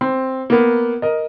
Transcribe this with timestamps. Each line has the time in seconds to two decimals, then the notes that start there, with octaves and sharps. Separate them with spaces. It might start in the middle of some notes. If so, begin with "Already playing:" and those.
0.01 C4
0.50 A#3 B3
1.02 A#4 D#5